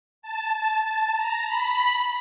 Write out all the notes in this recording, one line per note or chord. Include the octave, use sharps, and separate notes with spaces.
A5
A5
A5
A#5
B5